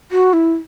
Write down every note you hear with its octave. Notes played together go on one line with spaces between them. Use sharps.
F#4
E4